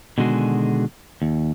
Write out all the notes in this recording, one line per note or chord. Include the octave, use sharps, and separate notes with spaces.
B2 D3 D#3 G#3 F#4 G#4
D#2